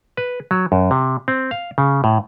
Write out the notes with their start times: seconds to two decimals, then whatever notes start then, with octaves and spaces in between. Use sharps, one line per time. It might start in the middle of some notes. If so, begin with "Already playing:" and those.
0.17 B4
0.51 F#3
0.72 F#2
0.91 C3
1.28 C4
1.51 F5
1.78 C#3
2.04 A2